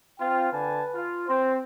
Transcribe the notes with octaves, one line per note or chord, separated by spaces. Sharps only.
C4 F4 G5
D3 B4 G#5 A5
F4
C4 C5